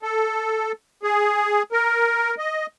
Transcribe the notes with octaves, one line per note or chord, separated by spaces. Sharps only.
A4
G#4
A#4
D#5